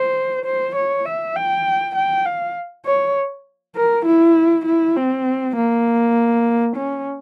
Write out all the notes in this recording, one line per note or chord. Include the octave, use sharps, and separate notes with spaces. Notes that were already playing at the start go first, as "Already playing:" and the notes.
Already playing: C5
C5
C#5
E5
G5
G5
F5
C#5
A#4
E4
E4
C4
A#3
C#4